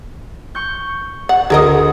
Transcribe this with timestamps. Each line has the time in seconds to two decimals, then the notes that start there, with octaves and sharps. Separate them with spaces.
0.55 C#6 G6
1.29 F#5
1.50 D2 G#4 A#4 D#5